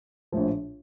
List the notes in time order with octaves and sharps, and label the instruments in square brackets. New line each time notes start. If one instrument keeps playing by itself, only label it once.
[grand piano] A#1 A2 F3